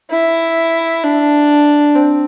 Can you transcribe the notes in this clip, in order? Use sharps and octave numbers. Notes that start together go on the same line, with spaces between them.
E4
D4
C4